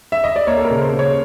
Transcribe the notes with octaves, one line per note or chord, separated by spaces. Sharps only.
E5
D#5
D5
A#3 C#5
A4
A#4
C#3
C5
C#3
C#5